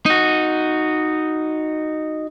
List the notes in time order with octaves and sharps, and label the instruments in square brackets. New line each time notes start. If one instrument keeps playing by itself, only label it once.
[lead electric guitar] D#4 F#4